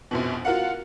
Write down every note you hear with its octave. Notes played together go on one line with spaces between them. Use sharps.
A#1 F2 B2
F4 F#4 A#4 F5 F#5